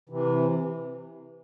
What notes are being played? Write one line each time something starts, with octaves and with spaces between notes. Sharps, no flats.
C3 E3